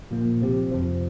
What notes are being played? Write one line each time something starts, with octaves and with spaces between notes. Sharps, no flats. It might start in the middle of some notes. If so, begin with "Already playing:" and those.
A#2 F3 A#3
C3 F3 C4 G4
F2 C3 F3